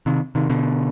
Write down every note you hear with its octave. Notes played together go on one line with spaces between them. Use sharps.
C3 D#3
C3 D#3
B2 D3